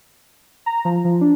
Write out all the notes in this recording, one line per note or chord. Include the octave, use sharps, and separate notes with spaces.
A#5
F3
F3
D4